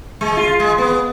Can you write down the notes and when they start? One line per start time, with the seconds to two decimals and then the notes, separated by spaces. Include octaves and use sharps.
0.21 G#3
0.37 F4
0.60 G#3
0.78 B3